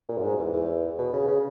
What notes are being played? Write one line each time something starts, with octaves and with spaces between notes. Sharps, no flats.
A#2
F#2
G#2
E2
E2
B2
C#3
C#3